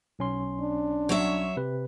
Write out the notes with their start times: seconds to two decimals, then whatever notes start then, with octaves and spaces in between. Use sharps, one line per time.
0.19 B1 C#4 C6
0.61 D4
1.09 F#3 C#5 E5
1.57 C3 B4